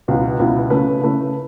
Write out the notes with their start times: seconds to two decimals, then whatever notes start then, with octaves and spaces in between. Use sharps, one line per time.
0.08 C#2 B2 B3 E4
0.39 C#2 B2 B3 E4
0.70 C#3 A3 E4 B4
1.02 C#3 A3 E4 B4